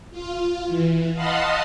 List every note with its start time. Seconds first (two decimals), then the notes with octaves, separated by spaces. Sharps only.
0.11 F4
0.67 E3
1.13 D#5 F5 F#5 A5 B5 C6